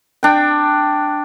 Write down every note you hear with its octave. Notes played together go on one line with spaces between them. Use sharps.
D4 G5